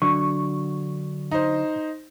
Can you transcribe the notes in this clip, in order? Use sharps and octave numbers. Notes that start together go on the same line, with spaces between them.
D3 F#3 C#6
D#4 C5